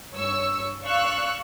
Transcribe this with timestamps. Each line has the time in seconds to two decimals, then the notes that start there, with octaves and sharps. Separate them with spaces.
0.13 G2 C#5 C#6 E6
0.83 D5 F5 C#6 E6 F#6